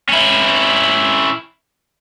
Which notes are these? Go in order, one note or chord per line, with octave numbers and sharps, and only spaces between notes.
C#4 E4